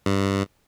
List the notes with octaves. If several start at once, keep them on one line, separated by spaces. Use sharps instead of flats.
G2